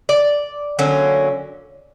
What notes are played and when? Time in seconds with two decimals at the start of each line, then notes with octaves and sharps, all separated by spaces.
0.09 D5
0.79 D3 F#3 A#3 C#4